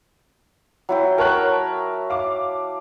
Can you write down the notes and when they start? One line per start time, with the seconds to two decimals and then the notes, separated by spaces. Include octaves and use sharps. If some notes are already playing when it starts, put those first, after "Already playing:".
0.89 F#3 E4 G5
1.18 A#4 C#5 A5 F#6
2.10 F5 D6